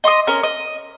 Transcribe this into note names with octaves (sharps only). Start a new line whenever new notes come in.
D#5 C6 C#6 D#6
C#4 A#4
D#5